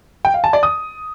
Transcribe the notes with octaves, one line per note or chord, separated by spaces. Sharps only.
G5
F5
A5
D5
D#6